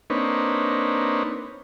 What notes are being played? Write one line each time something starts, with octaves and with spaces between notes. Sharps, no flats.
A#3 C4 D4 D#4 B4 C#5